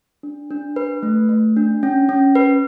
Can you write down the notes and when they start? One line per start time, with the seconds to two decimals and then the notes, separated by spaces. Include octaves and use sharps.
0.23 D4
0.51 D4
0.76 B4
1.03 A3
1.29 A3
1.56 D4
1.83 C#4
2.09 C#4
2.35 B4